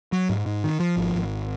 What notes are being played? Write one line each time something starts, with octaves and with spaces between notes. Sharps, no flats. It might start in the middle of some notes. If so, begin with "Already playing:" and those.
F#3
G#2
G#2
D#3
F3
G#1
G#1